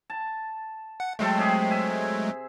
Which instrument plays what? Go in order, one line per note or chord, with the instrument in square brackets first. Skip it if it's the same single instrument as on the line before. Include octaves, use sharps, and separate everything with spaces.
[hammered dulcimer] A5
[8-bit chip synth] F#5
[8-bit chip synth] F#3 G#3 A3 [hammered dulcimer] A4 C5 G5
[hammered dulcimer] C3 G4 G#4
E5 G#5